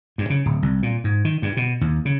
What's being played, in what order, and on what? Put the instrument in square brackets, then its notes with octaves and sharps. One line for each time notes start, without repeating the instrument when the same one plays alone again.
[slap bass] G2
C#3
D1
C2
A#2
G#2
D#3
G2
B2
D#2
C#3